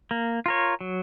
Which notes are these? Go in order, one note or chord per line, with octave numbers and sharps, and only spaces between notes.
A#3
F4 A#4 C#5
F#3